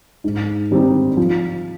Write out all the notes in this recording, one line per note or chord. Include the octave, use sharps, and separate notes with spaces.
G#2
D#3 G3 C4 D#4
F3